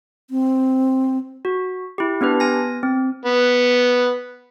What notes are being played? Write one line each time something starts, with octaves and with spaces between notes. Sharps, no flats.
C4
F#4
E4 G4
B3 D4 G4 B4
B3 G#5 A#6
C4
B3